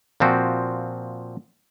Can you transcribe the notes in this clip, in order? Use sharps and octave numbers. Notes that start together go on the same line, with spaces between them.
A#2 F3 C4 F#4